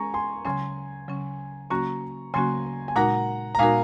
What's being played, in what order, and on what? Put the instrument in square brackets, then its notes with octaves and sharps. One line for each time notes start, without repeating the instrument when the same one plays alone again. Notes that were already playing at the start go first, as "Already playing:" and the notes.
Already playing: [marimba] G#3 C#4 G#4 [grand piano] G#5 A#5 C#6
[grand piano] G#5 C6
[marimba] C#3 F#3 C#4 [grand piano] G#5 C6
[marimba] C#3 F#3 C#4
[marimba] C#3 F#3 A#3 C#4 F#4 [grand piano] A#5 C#6
[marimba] C#3 F#3 A#3 C#4 F#4 [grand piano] G#5 C6
[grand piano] G#5
[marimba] A#2 G#3 D#4 F#4 A#4 [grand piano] F#5 A#5
[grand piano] A#5
[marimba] A#2 G#3 D#4 F#4 A#4 [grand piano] F5 G#5